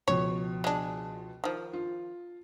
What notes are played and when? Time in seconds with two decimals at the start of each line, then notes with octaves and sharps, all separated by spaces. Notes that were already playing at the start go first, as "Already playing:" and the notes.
0.08 C#2 B2 F3 C#5
0.64 G#3 D4
1.44 D#3 F3
1.73 F4